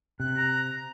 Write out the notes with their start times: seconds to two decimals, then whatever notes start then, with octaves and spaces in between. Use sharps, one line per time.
0.20 C3 F#6
0.37 A#5